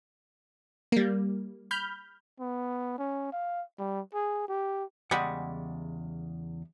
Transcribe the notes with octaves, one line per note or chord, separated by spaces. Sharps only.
G3 A#3
B5 F6 G6
B3
C#4
F5
G3
G#4
G4
E2 C#3 G3 G#3 F#5